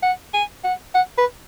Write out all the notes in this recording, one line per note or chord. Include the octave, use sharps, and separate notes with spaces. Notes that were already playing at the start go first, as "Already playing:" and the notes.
F#5
G#5
F#5
F#5
B4